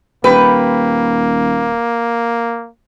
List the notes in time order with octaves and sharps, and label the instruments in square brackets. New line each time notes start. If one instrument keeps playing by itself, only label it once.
[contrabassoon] D#1 [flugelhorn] A#3 [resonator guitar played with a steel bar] G4 B4